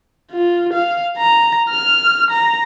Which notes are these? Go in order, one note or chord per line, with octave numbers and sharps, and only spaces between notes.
F4
F5
A#5
F6
A#5